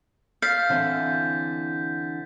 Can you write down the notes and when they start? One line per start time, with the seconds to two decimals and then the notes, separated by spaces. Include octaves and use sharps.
0.42 F5 G6 A6 B6
0.69 D3 E3 C4